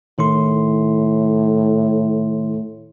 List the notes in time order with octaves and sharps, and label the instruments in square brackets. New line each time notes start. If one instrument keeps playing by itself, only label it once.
[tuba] A2 [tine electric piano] D#3 E4 C6